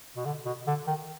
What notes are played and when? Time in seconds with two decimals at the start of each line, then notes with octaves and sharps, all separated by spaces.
0.17 B2
0.26 D3
0.46 B2
0.67 D3
0.87 D#3